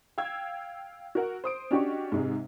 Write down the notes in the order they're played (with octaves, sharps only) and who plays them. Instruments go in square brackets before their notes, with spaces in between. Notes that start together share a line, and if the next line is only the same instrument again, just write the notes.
[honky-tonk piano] F5 G5 E6 G#6
F#4 A#4 F#5
C5 D#6 D7
C#4 D4 F#4 G4 D#5 C#6
G#2 C3 G#3